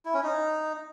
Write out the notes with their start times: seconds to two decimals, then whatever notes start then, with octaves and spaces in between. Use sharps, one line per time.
0.05 E4
0.14 C#4
0.23 D#4